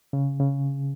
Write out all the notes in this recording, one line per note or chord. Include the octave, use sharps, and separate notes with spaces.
C#3
C#3